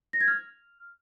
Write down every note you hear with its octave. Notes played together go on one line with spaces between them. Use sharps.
A#6
G#6
F6